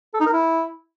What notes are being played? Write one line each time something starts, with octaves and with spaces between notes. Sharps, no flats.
A4
D#4
A#4
E4